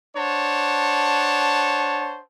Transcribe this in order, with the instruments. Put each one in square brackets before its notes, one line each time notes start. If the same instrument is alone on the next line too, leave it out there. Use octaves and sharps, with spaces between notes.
[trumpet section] D4 C5 C#5 F#5 A5